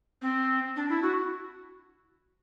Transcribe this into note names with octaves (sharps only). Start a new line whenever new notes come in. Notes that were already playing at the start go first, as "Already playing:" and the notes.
C4
D4
E4
F#4